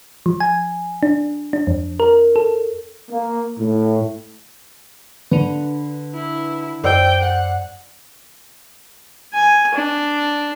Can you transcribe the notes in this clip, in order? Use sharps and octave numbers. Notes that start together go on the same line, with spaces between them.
F3
G#5
D4
D4
F2
A#4
A4
A#3
A2
D3 D4 B4
E4
F#2 C5 D5 G5 E6
F#5
G#5
D4